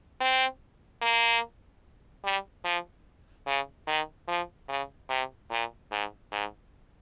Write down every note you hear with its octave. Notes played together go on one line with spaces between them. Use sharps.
C4
A#3
G3
F3
C#3
D#3
F3
C#3
C3
A#2
G#2
G#2